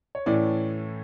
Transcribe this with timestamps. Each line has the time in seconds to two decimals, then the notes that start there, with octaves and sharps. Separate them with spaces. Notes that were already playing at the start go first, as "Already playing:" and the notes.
0.15 C#5
0.26 A2 E3 A3 C#4 D5